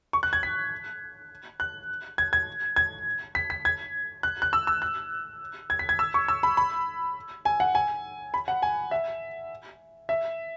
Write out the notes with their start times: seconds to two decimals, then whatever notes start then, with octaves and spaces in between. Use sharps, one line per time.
0.13 C#6
0.23 F#6
0.33 G#6
0.43 B6
1.60 F#6
2.18 G#6
2.33 G#6
2.76 G#6
3.35 B6
3.50 B6
3.65 G#6
4.23 F#6
4.42 F#6
4.53 E6
4.67 E6
4.82 F#6
5.70 G#6
5.79 B6
5.89 G#6
5.99 E6
6.14 C#6
6.28 E6
6.43 B5
6.57 B5
7.45 G#5
7.60 F#5
7.75 G#5
8.34 B5
8.48 F#5
8.62 G#5
8.91 E5
10.09 E5